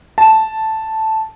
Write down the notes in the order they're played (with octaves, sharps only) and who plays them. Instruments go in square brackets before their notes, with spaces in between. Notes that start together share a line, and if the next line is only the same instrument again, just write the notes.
[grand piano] A5